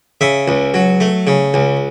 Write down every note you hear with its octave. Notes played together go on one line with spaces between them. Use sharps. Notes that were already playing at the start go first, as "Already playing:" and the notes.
C#3 E5
C#2
F#3
A3
C#3
C#2